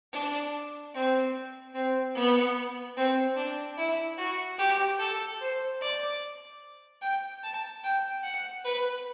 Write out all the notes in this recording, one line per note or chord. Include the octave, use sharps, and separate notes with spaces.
D4
C4
C4
B3
C4
D4
E4
F#4
G4
A4
C5
D5
G5
A5
G5
F#5
B4